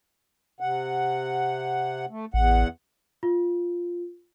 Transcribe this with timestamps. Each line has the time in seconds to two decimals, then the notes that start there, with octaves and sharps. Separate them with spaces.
0.60 C3 F#5
2.10 A3
2.34 A1 E2 F#5
3.23 F4